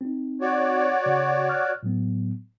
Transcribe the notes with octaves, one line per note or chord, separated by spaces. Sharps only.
C4 D#4
F#4 C#5 D5
C#3
F6 F#6
A2 F#3 B3